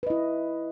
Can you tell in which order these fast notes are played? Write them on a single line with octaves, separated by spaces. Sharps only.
B4 D#5 E4